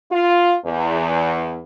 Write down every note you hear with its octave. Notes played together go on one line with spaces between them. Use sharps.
F4
E2